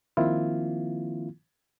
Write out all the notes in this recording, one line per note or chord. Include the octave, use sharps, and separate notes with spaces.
D#3 F3 A#3 C4 E4 F4